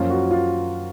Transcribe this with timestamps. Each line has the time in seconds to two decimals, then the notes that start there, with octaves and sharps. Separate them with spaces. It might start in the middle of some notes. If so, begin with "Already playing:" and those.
Already playing: F#2 F3 A#3 C#4 F4
0.10 F#4
0.31 F4